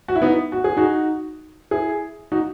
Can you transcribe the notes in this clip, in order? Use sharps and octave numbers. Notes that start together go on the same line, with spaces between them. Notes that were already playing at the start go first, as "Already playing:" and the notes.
F#4
E4
B3 D#4
F#4
G#4
D#4 F#4
E4 G#4
D#4 F#4